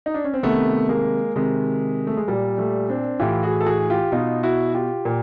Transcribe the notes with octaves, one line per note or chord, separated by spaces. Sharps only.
D#4
D4
C#4
C4
C3 D#3 A3 B3
G#3 A#3
C3 D#3 G#3
A3
G#3
A#2 G3
G3 A3
C4 D4
A2 E3 F4 G4
F#4 G#4
A4
F#4 G#4
F4 G4
B2 D#4 F4
E4 F#4
F4 G4
A#2